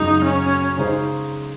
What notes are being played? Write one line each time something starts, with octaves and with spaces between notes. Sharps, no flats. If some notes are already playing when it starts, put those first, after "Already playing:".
Already playing: F#2 C#3 G#3 D#4
C#4
C#3 G#3 D#4 G#4 C5